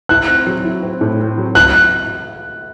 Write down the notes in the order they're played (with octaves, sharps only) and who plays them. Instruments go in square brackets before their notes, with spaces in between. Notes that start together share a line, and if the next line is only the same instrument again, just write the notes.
[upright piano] E4 [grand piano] F#6
[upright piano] C4
F#3
E4
C4
A2
C4
F#3
[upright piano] E4 [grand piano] F#6